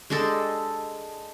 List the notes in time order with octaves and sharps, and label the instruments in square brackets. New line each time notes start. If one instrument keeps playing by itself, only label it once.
[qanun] G#3 D4 G4 A4